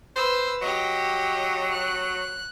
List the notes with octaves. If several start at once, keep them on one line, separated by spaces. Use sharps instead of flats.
B4 C5 E6
F#3 G4 D#5
F#6